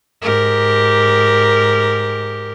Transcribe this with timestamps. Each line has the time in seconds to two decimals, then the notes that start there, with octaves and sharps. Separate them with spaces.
0.22 G#2 G4 A#4